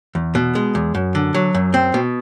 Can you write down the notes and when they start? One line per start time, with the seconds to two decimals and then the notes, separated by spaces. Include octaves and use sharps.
0.15 E2
0.35 B2
0.55 G#3
0.75 E2
0.95 F#2
1.15 D3
1.34 F#3
1.55 F#2
1.74 C4
1.94 B2